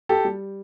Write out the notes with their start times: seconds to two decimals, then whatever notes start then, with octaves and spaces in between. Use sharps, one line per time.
0.09 G4 A4
0.25 G3